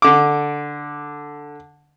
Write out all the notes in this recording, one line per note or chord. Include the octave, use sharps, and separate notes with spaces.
D3 D6